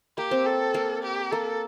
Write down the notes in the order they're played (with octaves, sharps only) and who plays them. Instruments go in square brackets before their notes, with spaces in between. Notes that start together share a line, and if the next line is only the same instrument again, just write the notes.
[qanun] A#3 [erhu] G4
[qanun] C4
[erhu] A4
[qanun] A#3
[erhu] G4
[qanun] A#3 [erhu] A4